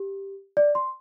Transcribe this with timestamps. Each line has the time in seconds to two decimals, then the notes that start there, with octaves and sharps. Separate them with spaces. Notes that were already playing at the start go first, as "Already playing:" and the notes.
Already playing: G4
0.57 D5
0.75 C6